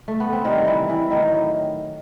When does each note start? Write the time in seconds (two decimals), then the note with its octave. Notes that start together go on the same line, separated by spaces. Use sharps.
0.08 A3
0.20 B3
0.33 C4
0.45 C3 D#3 E3 G3 D#4
0.67 E3 E4
0.89 E3 E4
1.10 A2 D#3 F#3 D#4